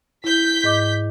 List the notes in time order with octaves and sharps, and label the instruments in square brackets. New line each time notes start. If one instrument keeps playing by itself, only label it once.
[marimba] E4 [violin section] G6 B6
[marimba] G#2 D#5 D6